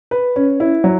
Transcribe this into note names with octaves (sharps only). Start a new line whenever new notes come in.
B4
C#4
E4
F#3